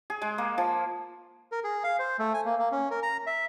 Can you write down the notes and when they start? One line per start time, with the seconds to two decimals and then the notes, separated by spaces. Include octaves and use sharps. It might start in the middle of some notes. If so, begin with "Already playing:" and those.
0.10 G#4
0.22 G#3
0.38 A#3
0.58 F3
1.52 A#4
1.64 G#4
1.84 F5
1.99 C5
2.19 A3
2.34 G#5
2.45 A#3
2.59 A#3
2.72 C#4
2.91 A#4
3.03 A#5
3.27 E5